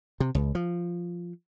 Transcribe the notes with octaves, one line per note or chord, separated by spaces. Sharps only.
C3
C#2
F3